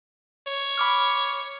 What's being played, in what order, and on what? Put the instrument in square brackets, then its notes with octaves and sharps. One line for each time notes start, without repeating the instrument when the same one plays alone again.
[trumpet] C#5
[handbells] B5 D6 F6